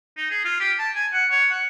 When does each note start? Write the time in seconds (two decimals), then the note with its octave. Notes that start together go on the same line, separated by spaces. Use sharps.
0.17 D#4
0.30 G#4
0.45 F4
0.60 G4
0.79 A5
0.95 G#5
1.13 F#5
1.31 C#5
1.50 F#5